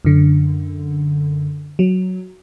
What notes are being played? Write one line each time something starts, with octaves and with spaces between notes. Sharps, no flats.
F#2 D3
F#3